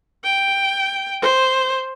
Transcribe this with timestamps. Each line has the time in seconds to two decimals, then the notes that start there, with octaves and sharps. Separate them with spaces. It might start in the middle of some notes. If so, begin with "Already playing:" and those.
0.24 G5
1.22 C5